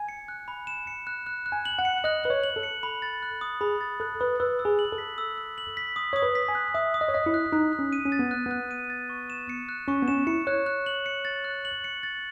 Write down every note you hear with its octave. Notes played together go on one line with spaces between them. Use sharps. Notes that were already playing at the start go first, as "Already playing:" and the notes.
Already playing: G#5
C#7
F#6
B5
E7
C#7
F#6
F#6
F#6
G#5
F#7
F#5
C#7
D#5 F#6
B4 F#6
C#5
F#7
A4
C#7
B5
A6
F#6
D#6
G#4 B5
A6
A4 F#6
B4 D#6
B4 E6
E6
G#4
F#7
A4
B6
E6
E6
F#7
B6
D#6
C#5 D#6
B4
B6
G#5
F#6
E5 D#6
D#6
D#5
C#5
D#5 B6
E4
F#6
D#4 F#6
F#6
C#4
D#7
C#4
A6
B3
F#6
B3 F#6
D#7
A6
C#6
E7
C#7
F#6
C#4 C#6
B3
C#4 E7
E4 C#7
C#5 F#6
F#6
F#7
C#7
A6
F#6
F#7
C#7
A6